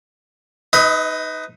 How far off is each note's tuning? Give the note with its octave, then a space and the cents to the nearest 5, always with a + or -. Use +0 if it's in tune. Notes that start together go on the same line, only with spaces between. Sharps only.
D#4 +0 B4 +20 D#5 +40